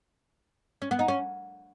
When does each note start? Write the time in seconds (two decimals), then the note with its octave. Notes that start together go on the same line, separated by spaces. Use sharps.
0.82 C#4
0.91 B3
0.99 D#4
1.08 C#4